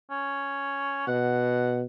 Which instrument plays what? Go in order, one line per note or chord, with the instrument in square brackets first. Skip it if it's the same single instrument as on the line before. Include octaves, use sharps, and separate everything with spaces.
[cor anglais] C#4
[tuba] B2 [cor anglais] F#5